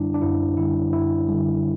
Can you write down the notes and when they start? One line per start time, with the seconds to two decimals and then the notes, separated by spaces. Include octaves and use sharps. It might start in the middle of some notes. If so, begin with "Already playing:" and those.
Already playing: F#2 D3 G3 D4 E4
0.14 D4
0.22 F#2 E4
0.57 D3 G3 E4
0.93 F#2 E4
1.29 D3 G3